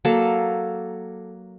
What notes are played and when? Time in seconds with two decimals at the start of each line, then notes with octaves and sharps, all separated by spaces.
0.05 F#3 A#3 A4 A5